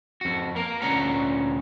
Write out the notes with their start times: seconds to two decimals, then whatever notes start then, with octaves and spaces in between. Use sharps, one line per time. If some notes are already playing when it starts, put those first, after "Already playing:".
0.21 F2 F#4
0.56 A#3 A#4
0.82 D2 A#2 C#4 C#5 F#5 A#5